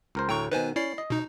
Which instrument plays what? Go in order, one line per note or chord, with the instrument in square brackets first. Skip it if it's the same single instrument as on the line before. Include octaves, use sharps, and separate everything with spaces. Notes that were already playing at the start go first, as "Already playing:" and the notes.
[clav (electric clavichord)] C#2 A#4 C5
[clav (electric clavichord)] D2 A2 [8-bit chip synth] G5 A#5 C#6
[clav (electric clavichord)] B2 D#3 [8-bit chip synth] B4 C5 G#5
[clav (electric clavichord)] C#4 [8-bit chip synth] E4 D5 C7
[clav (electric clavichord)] D#5
[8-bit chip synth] B2 D#4